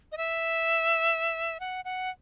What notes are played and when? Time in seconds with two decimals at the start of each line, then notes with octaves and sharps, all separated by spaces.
0.12 D#5
0.17 E5
1.60 F#5
1.85 F#5